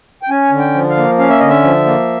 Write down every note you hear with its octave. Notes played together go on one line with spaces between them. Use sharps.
G5
C#4 G#5
D3
G5
F3
F5
A#3
C#4 F5
E5
D3 D#5
E5
F3
A#3